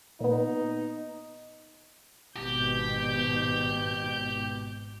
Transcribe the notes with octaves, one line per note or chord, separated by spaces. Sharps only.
A#2 B3 D#4
G#1 B2 G4 G6